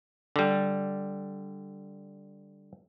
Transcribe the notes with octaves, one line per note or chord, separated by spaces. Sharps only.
D3 G3